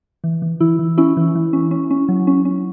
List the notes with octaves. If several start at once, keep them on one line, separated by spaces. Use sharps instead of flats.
E3
E3
E3 E4
E3
C#4 E4
E3
E3
C#4
C#4
C#4
F#3
C#4
C#4